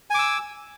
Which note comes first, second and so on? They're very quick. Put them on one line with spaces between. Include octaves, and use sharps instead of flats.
G#5 D6 E6